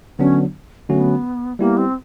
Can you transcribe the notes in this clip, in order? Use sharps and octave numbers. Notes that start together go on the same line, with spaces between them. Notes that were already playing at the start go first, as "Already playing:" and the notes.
D3 F#3 B3 C#4 D4
D3 F#3 A3 B3 C#4 F#4
G3 A#3 B3 E4 G4
C4